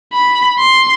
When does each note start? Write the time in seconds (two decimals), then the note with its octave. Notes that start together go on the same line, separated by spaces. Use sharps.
0.13 B5
0.59 C6